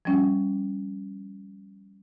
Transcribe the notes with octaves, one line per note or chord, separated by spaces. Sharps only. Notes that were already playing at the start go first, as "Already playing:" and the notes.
F3 G3 C#4